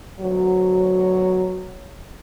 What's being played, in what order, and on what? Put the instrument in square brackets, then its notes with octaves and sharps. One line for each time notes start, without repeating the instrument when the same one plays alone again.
[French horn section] D2 B2 F#3